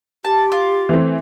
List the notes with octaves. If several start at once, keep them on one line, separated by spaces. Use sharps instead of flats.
G4 A5
F4
E3 A3 C4